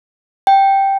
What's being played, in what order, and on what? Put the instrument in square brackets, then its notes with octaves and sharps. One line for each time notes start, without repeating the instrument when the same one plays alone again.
[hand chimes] G5